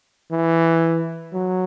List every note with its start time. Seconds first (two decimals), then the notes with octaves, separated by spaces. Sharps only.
0.31 E3
1.33 F#3